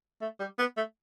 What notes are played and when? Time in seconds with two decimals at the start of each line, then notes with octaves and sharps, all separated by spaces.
0.21 A3
0.40 G3
0.59 B3
0.77 A3